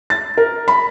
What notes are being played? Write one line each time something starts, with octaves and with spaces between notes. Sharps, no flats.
A6
A#4
B5